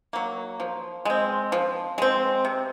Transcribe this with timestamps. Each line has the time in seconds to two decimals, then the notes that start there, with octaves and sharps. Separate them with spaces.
0.13 F#3 A#3
0.60 F3
1.05 G#3 C4
1.52 F3
1.98 G#3 C4
2.45 C3